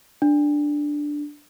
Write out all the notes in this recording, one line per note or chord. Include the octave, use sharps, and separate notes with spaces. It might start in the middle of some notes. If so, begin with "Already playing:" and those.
D4